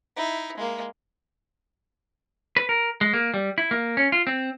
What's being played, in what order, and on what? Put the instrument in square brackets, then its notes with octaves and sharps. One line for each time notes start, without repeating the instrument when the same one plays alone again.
[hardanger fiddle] D#4 E4
G#3 A#3
[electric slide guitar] B4
A#4
G#3
A#3
G3
E4
A#3
C#4
F4
C4